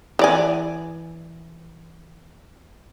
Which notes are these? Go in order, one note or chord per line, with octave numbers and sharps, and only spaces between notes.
E3 D5 G#5